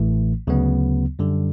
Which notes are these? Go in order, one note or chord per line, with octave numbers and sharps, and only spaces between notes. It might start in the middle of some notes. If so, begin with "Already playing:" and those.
Already playing: A1 A2 E3 A3
D2 C#3 F#3 B3
F#2 D3 G3